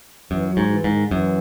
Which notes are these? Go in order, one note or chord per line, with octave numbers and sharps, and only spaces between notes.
F#2 E3
F#3
G#2
E3
G#2
D#3
F#2 E3